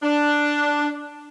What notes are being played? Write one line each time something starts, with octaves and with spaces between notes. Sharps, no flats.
D4